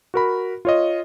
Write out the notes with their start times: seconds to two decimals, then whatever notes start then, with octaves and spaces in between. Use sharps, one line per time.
0.14 F#4 A#4 B5
0.65 F4 C#5 D#5